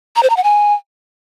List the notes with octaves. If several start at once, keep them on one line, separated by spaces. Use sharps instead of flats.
A#5
C5
A#5
F#5
G#5